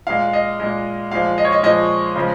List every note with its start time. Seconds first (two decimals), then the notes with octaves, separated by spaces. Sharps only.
0.07 A#2 G#3 F5
0.33 D#5
0.60 A#2 G#3
1.12 A#2 F3 G#3 F5
1.38 D#5
1.45 C#5
1.52 D#5
1.63 A#2 F3 G#3 D#5
2.16 C#3 F3 G#3